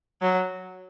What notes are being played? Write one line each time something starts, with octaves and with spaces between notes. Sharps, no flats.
F#3